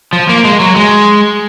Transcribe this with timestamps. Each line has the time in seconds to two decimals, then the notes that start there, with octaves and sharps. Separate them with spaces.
0.13 F3
0.29 A#3
0.45 G#3
0.60 F#3
0.76 G#3